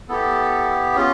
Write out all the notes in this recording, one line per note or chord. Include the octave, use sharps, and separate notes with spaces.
B3 E4 G4 A4
C#4 F4 G#4